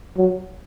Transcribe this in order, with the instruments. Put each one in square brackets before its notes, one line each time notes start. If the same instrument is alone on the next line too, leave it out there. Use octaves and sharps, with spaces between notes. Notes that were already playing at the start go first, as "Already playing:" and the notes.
[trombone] F#3